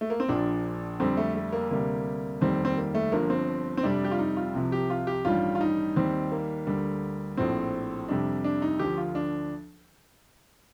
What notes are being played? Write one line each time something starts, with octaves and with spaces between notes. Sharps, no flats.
A3
A#3
C4
A#1 A#2 F3 D4
F2 D3 G3 C4
A3
A3
A#3
D2 C3 G3 A#3
F1 D#2 D#3 G3 C4
C4
A#3
A3
G1 G2 F3 A#3
C4
C4
F2 C3 G3 D4
G4
F4
D#4
F4
C2 C3 F3
G4
F4
G4
A1 G2 D#3 G3 F4
F4
D#4
D#2 D#3 G3 C4
A#3
D2 D3 G3
A#1 A2 F3 C4
F2 C3 G3 D4
D4
D#4
D2 D3 F3 G4
F4
D4